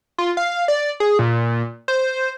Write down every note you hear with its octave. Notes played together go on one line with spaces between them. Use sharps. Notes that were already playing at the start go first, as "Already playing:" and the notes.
F4
F5
D5
G#4
A#2
C5